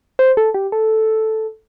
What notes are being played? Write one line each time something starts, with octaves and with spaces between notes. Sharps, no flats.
C5
A4
G4
A4